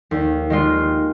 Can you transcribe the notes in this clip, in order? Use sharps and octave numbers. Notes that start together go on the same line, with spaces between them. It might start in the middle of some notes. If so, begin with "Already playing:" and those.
D#2
D#3 G#3 F4